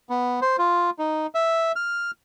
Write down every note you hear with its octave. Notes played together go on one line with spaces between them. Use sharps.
B3
C5
F4
D#4
E5
F6